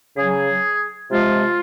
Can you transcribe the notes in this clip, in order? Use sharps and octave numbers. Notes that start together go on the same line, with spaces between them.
C#3 F#3 G#4
C3 F3 G#3 F4